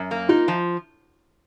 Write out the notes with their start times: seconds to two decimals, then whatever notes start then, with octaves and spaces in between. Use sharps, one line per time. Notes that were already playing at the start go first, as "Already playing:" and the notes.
Already playing: F#2
0.11 A#3
0.29 D#4 F4
0.48 F3